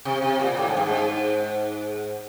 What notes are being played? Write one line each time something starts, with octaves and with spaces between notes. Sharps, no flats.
C3
C3
A#2
A2
G#2
G2
G#2